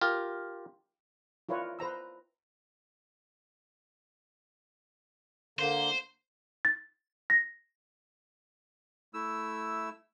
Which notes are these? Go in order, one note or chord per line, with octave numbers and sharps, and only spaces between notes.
F4 G4 A#4
E4 F4 A#4 B4 C#5 D5
B4 C5 A#5 E6
D3 A#3 C5
A6
A#6
A3 E4 E6